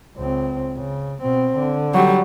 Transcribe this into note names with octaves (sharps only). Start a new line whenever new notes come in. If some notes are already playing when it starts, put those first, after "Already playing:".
C#2 C4
C#3
B2 C4
D3
F#3 G3